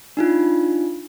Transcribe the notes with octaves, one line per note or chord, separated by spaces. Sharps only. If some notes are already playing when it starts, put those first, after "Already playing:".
D4 D#4 F4